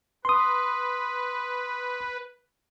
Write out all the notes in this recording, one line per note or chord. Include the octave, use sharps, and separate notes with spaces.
B4 C6 D#6